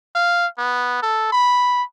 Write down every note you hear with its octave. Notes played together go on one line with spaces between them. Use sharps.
F5
B3
A4
B5